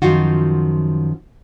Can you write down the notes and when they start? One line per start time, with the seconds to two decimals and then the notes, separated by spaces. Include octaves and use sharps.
0.02 F#2 D#3 F3 F4 F#4